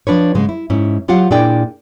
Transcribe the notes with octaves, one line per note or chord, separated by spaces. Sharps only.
F3 D4 B4 C#5
G#2 C#3 G#3
E4
G#2 C#4 E4
F#3 F4 G4 F5 F#5
A#2 D4 E4 G#4 D5 G5